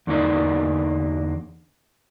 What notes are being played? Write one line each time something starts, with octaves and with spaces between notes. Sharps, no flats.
E2 D3 A#3 D#4 D5